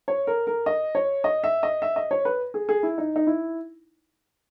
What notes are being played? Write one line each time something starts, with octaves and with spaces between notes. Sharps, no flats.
C#5
A#4
A#4
D#5
C#5
D#5
E5
D#5
E5
D#5
C#5
B4
G#4
G#4
E4
D#4
D#4
E4